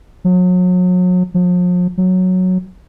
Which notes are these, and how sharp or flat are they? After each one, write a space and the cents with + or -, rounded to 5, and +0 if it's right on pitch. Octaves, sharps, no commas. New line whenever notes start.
F#3 -35
F3 +40
F#3 -5